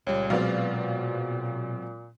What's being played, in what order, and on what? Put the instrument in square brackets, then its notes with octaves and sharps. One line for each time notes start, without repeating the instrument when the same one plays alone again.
[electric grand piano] C#2 G3 [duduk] A#2 [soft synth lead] C#5
[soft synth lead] B2 [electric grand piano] F#3 G#3 C4 [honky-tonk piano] B3 D5 F5